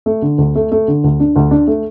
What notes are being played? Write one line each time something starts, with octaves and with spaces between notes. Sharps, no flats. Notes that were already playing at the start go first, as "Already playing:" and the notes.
A3
D3
D2
A3
A3
D3
D2
D4
D2
D4
A3